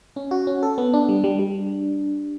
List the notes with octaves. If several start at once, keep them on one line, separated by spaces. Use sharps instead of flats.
C#4
F#4
C#4
A4
B3
D4
G3
G3
G3